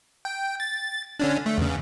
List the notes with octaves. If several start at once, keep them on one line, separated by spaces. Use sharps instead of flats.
G5
A6
D3 C#4 D4
A3
E2 C#3